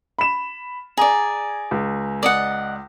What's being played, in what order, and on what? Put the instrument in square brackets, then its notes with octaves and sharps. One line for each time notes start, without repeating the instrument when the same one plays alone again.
[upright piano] B5 E7
[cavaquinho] G#4 D5 [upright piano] G#5 A#5
[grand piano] C#2
[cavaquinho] D5 D#5 F#5